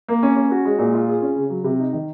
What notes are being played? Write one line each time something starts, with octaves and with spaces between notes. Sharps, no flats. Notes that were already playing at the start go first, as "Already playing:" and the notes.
A#3
C#4
C#4
F#4
G#3
A#2
F4
G#4
C#4
C#3
F#3
C3
D#4
D#3